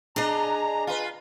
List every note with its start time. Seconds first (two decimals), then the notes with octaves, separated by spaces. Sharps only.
0.16 D4 G#4 D#5 A#5
0.87 F4 B4